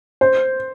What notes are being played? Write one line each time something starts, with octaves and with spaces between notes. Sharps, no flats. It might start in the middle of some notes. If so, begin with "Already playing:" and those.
C5